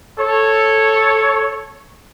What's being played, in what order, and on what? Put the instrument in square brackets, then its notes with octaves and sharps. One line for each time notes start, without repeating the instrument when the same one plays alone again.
[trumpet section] A4 C#5